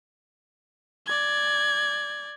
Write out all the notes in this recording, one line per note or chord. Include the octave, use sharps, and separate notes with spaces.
D5 G#6